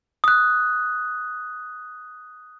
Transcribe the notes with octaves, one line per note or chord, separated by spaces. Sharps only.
D#6 F#6